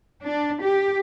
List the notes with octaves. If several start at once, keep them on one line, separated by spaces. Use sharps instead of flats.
D4
G4